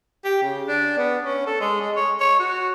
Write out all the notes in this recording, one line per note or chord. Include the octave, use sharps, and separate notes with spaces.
G4
C#3
D4
B3
C#4
A4
G#3
G#3
C#5
C#5
F#4